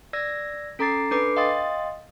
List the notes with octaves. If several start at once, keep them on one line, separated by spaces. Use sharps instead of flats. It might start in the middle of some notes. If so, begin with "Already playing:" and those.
D5 E6 G#6 A#6
C#4 A4 A#5 D6 A6 C7
D4 A4 B4 D6 C7
D#5 F5 G5 C6 D#6 A6